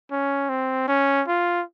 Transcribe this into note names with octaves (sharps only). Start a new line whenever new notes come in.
C#4
C4
C#4
F4